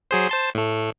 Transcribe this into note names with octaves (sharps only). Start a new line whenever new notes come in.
F#3 G#4 C5
C5 A5 C6
A2 A3